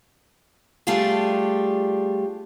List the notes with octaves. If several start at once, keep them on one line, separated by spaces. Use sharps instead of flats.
G3 A3 D4 F4 G4 G#4